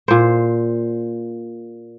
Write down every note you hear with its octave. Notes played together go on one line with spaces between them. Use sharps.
A#2 C5